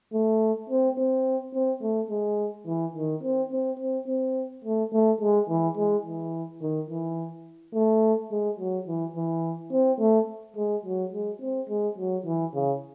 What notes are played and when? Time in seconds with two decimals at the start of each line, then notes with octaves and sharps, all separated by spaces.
0.13 A3
0.69 C4
0.98 C4
1.55 C4
1.82 A3
2.10 G#3
2.67 E3
2.95 D#3
3.23 C4
3.52 C4
3.79 C4
4.08 C4
4.64 A3
4.93 A3
5.21 G#3
5.49 E3
5.77 G#3
6.05 E3
6.62 D#3
6.90 E3
7.75 A3
8.31 G#3
8.59 F#3
8.88 E3
9.16 E3
9.72 C4
10.00 A3
10.57 G#3
10.85 F#3
11.13 G#3
11.41 C4
11.69 G#3
11.98 F#3
12.26 E3
12.54 C#3